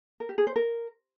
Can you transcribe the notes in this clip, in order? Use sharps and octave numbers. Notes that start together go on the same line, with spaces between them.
A#4
G4
G#4
C5
A#4